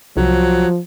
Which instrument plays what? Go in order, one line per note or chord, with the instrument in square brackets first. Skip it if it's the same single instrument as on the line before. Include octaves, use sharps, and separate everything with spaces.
[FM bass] C2 [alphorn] F3 [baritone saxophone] F#3